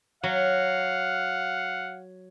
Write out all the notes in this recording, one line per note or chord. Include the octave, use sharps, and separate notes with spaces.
F#3 F5 F#5